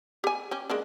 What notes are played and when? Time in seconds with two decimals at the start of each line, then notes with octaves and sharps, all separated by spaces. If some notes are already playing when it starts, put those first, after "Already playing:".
0.24 G4 G#5
0.51 C#4 G4
0.70 G#3 A#3 D4